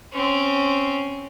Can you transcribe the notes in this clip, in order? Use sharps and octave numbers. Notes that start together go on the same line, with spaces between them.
C4 C#4